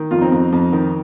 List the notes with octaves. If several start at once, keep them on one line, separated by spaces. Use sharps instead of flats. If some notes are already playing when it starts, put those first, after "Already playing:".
Already playing: D#3
F2 F4
C4 D#4
F2
F2
D#3